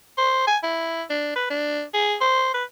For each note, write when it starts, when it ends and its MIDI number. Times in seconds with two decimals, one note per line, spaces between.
0.18 0.43 72
0.47 0.57 80
0.63 1.03 64
1.10 1.31 62
1.36 1.48 71
1.50 1.82 62
1.94 2.15 68
2.21 2.51 72
2.54 2.64 71